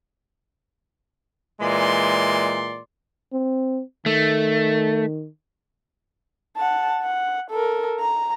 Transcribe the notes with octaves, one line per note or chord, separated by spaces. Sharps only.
A#2 E3 G#3 D5 C6
C4
D#3 A3
F#5 A5
F#5
A4 A#4
A#5